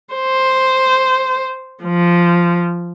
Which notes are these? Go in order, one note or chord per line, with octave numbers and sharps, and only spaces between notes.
C5
F3